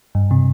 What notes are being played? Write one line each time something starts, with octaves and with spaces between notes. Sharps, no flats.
G2
C3